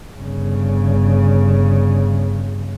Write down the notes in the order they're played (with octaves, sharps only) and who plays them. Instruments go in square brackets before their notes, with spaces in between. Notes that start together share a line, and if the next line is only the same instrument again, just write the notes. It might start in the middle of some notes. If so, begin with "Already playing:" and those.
[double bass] G1 C#3